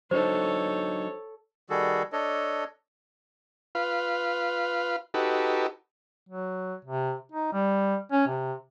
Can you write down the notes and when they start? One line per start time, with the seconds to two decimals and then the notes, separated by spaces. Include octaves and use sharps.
0.11 F#3 D4 D#4 A4 C5 C#5
1.70 D#3 G3 F#4 G#4 A4
2.13 D4 A4 C#5 D#5
3.75 F4 B4 F5
5.14 D#4 F#4 G4 A4 B4
6.29 F#3
6.85 C3
7.32 D#4
7.53 G3
8.12 C#4
8.28 C3